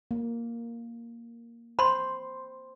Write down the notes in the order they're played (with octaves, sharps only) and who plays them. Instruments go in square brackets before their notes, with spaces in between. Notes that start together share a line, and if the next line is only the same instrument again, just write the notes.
[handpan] A#3
[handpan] C5 [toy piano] B5 C6